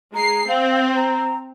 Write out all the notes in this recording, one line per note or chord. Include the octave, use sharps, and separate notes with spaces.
G#3 A#5 C7
C4 F5
A#5